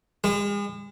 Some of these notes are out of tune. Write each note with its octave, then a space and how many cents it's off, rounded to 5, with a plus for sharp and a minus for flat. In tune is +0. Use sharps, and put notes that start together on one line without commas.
G#3 -40